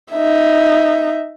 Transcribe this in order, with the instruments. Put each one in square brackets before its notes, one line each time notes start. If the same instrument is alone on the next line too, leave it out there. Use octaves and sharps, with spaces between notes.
[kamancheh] D#4 E5